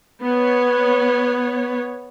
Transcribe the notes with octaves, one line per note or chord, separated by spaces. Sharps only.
B3 C#5